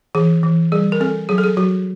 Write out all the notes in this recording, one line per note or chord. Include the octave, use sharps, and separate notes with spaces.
E3 G#4
E3
G3 G#4
A#4
C4 A4
F#3 G#4
A4
G#4
F#3 F#4